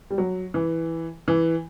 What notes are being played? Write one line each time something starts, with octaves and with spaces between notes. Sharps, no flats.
G3
F#3
E3
E3